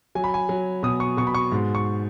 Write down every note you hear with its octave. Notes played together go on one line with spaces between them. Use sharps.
F#3 G#5
B5
G#5
F#3
B2 D#6
C#6
B2 C#6
B5
C#6
G#2
C#6